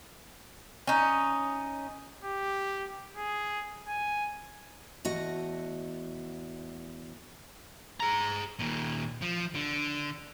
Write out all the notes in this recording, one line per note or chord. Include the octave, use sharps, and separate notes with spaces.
C#4 D#4
G4
G#4
G#5
E2 A3 F#4 D#5
G#4 A#5
D#2 A#2
F3
D3